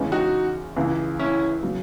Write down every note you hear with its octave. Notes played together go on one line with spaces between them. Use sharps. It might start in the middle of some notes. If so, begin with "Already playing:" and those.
Already playing: E2 C#3 E3 G#3 C#4
D#4 F#4
C#2 C#3 E3
C#4 E4
C#3 F#3